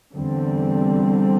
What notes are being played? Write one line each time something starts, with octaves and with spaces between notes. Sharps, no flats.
E2 D3 G3 C4